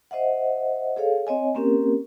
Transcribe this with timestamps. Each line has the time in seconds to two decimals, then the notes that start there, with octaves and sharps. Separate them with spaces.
0.11 C5 D#5 E5 F#5
0.96 G#4 A4 C#5 F5
1.27 C4 C#5 D#5 G#5
1.55 A#3 C4 C#4 G4 A#4